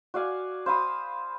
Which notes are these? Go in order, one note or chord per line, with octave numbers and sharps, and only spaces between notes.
F#4 D5 F5 G#5
C5 F5 B5 D#6